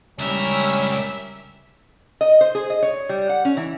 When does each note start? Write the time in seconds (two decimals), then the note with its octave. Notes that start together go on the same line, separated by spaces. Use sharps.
0.19 C#2 G3 C#4 A#4 E5
2.21 D#5
2.41 C5
2.55 G#4
2.70 D#5
2.83 C#5
3.09 G3
3.29 F#5
3.45 C#4
3.57 E3